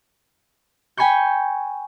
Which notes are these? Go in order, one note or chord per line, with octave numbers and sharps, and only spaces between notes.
G5 G#5 B5 C#6 G6